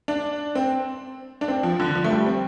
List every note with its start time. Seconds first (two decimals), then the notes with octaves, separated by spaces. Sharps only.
0.08 D4
0.55 C4
1.41 D4
1.48 C4
1.63 F3
1.80 D3
1.95 F3
2.04 A3
2.11 G3
2.26 C4